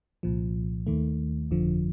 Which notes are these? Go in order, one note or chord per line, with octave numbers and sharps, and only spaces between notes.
C2 A#2 F3
D#2 D#3 A3
G1 F2 D3 F3